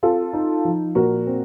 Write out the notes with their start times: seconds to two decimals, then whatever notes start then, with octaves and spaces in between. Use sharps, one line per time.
0.03 C4 F4 A4
0.33 D#4
0.65 F3
0.95 A#2 F#4 A#4
1.27 C4